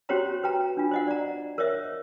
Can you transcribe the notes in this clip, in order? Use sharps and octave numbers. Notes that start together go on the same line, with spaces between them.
C#4 F#4 G4 C5 C#5 A#5
B4 G5 A#5
D4 F4
C5 D#5 F#5
D5 A#5
A#4 C5 C#5 D#5 E5